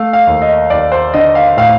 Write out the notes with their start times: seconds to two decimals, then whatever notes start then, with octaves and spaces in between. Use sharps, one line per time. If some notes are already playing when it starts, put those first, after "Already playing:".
Already playing: A3 F5
0.13 F5
0.27 D#2
0.42 D#5
0.70 D#2 D5
0.92 C5
1.14 D3 D#5
1.35 F5
1.57 A2 F5